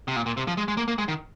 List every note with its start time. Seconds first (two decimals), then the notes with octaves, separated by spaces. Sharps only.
0.08 C3
0.16 A#2
0.26 A#2
0.37 C3
0.48 F3
0.57 G#3
0.68 G#3
0.77 A#3
0.88 A#3
0.98 G#3
1.08 D#3